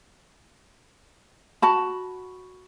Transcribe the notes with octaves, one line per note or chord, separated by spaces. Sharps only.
F#4 A5 B5